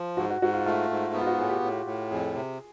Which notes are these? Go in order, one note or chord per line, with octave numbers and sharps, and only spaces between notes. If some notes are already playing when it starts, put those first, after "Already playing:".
Already playing: F3
G#2 F#4
F#4
G#2 F#4
F4
A3 F4
G#2
B3
F4
F#4
A2 G#4
G4
A2
A2
F2 G#4
C3